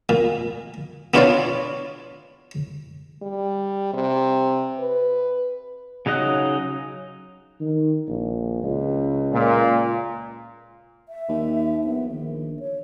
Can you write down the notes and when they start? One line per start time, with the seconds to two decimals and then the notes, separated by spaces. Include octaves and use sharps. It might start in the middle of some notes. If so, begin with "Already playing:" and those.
0.09 A#2
1.14 B3 D4 F4 C#5 D5 F5
3.22 G3
3.94 C3
4.80 B4
6.06 C#3 F#3 D#4 D#5 F#6
7.61 D#3
8.08 A#1
8.63 C#2
9.33 A#2
11.09 E5
11.29 D#2
11.84 A#1 B3
12.12 D#3
12.59 C#5